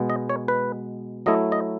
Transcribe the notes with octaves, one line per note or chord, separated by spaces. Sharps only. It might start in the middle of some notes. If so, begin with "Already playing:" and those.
Already playing: B2 G#3 B3
D#5
C#5
B4
F#3 A3 E4 D#5
D#5